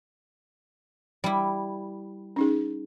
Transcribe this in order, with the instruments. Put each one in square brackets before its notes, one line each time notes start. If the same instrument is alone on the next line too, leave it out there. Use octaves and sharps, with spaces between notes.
[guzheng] G3 E4
[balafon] C#4 D#4 G#4